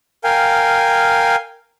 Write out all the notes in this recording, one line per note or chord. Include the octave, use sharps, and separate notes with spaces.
A#4 F5 G5 G#5